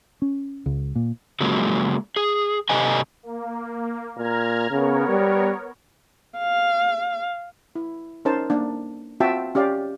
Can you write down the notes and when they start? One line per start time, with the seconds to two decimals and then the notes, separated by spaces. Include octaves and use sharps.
0.22 C#4
0.66 C#2
0.95 A#2
1.40 C#3 F3 F#3 G#3 A#3
2.16 G#4
2.69 C3 G4 A4 B4 D#5 G#5
3.23 A#3
4.17 A#2 A#5 F6 G#6
4.71 C#3 B3 A#4 C#5
5.09 G3
6.38 F5
7.75 E4
8.25 C#4 D#4 A#4 C5 A5
8.50 A#3 D4
9.20 C4 F4 F#4 E5 G5 A5
9.55 C#4 G4 D5 F5